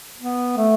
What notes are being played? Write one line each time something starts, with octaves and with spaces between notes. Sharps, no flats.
B3
A3